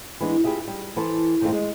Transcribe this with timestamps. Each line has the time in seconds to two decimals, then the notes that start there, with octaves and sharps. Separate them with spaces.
0.21 E3 G#3 B3 D4
0.44 E4 F4 G4 G#4 E5
0.68 G3
0.96 E3 A4 C5 A5
1.41 G#2 D#3 A3 C4 F4
1.53 G#3